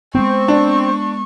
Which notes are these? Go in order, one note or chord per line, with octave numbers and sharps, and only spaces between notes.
G#3 A3 B3 C4 C#6
D4